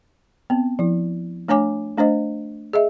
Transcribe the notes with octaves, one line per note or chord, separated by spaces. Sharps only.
B3 C4
F3 E4
A3 D4 C#5 G#5 D6
A3 D4 C5 D#5
G#4 D#5 E5